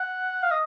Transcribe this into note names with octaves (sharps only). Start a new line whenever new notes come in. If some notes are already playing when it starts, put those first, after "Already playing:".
Already playing: F#5
F5
D#5